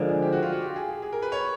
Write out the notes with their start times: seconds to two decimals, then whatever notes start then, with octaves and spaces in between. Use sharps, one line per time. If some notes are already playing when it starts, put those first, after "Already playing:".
Already playing: D3 F3 G#3 A#4
0.09 G#4
0.22 G4
0.32 F#4
0.42 F4
0.52 F#4
0.62 G4
0.76 G#4
0.89 G#4
1.02 G#4
1.12 A#4
1.22 B4
1.32 C#5